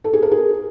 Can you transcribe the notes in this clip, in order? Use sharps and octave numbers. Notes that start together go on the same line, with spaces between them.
A4
G#4
A#4
G#4